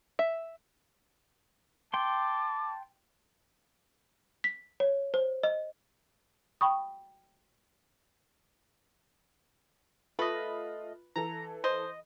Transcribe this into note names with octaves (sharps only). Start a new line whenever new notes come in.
E5
G5 A5 C6 D6
B6
C#5
C5
D#5
G5 B5 C#6 D#6
A3 F4 B4 D#5
E3 A4 A#5
C5 D#5